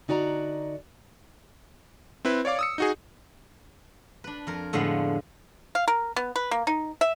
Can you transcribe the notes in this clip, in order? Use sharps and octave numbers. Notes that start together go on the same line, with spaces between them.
D3 D#4 F#4 D5 A5 A#5
C4 E4 B4
C#5 D5 F5 D6
D#6 E6 C#7
D#4 F#4 G#4
D4 B4
F2 A#4
A2 D3 F3 G#3 B3
F5
A#4
B3
B4
A#3
D#4
E5